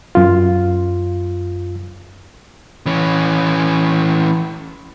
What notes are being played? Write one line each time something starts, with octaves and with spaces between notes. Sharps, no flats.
F#2 F4
E3 C#4